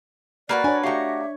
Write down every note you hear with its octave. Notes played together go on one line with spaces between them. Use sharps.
A#3 F#4 A#4 B4 D5
D4 C#5 G#5
A3 F#4 G4 E5 F5 A#5